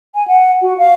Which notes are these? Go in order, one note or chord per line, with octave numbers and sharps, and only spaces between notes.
G#5
F#5
F#4
F5